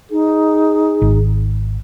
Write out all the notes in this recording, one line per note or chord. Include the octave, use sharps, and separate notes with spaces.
D#4 G#4
G#1